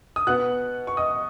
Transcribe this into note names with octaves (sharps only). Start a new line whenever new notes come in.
D#6
B2 B3 F#5 F#6
C#6
D#5 D#6